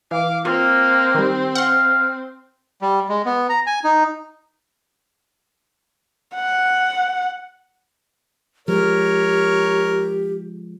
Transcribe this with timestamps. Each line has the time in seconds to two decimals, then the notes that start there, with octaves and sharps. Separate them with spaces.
0.11 E3 F5 D6
0.45 A#3 C4 F4
1.15 D#3 G3
1.55 F5 F#5 C6
2.82 G3
3.09 G#3
3.26 B3
3.49 A#5
3.67 G#5
3.84 D#4
6.35 F#5
8.68 F3 G#3 G4 A#4 C#5